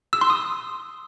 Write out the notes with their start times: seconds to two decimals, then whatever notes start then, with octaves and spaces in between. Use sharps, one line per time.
0.13 E6
0.21 C6
0.30 D#6